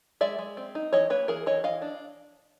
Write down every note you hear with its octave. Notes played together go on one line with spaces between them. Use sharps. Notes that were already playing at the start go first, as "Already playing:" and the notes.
G#3 D5 E5
G#3
C4
D#4
E3 C#5 D#5
A#3 B4 C#5
E3 G#4 A#4
E3 C#5 D#5
E3 D#5 F5
D4